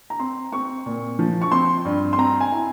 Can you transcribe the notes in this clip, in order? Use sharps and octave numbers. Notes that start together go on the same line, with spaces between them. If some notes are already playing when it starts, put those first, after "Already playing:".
A#5
C4 C6
C4 C#6
A#2
F3
C#6
C4 C6
G2
C6
C4 A#5
G#5
E4